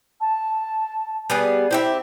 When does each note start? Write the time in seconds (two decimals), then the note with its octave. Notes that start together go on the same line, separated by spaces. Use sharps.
0.21 A5
1.30 G3 B3 G#4
1.71 C4 E4 G4 E5